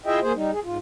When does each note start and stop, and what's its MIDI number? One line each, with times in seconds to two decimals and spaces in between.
0.06 0.20 64
0.06 0.20 65
0.06 0.20 68
0.06 0.20 75
0.06 0.20 76
0.06 0.20 79
0.21 0.32 58
0.21 0.32 68
0.21 0.32 72
0.35 0.51 55
0.35 0.51 63
0.52 0.60 68
0.64 0.78 44
0.64 0.78 65